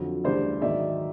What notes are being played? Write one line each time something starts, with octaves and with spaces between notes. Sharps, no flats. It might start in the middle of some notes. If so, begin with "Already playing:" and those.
Already playing: F2 D3 F#3
D2 C#3 E3 G3 C5 D5
G#2 D#3 F#3 D5 E5